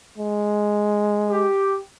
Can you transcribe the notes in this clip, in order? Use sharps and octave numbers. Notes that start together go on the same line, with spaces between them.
G#3
G4